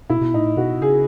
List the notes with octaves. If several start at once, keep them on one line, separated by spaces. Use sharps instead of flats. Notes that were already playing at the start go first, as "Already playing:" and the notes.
B2 E4
B2
A2 D#4
B2 F#4
C#3 G#4